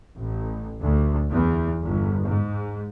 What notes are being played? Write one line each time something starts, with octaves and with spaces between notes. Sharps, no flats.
A1
D2
E2
G1
G#2